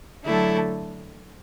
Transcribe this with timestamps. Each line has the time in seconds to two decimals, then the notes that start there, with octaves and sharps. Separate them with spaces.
0.24 D3 F#3 A3 E4 A4